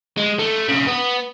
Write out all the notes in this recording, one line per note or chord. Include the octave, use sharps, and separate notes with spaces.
G#3
A3
B1 C#3
B3